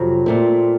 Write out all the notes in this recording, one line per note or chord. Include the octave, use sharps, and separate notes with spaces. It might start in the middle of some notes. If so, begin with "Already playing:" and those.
Already playing: F2 C3 F#3
A#2 A3 C4